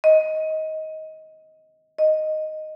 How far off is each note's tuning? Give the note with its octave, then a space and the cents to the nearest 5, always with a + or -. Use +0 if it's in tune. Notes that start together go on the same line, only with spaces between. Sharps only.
D#5 +15
D#5 -5